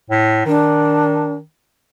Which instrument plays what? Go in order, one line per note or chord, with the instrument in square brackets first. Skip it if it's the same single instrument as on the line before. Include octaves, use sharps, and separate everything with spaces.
[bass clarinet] A2
[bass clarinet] D#3 [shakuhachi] D4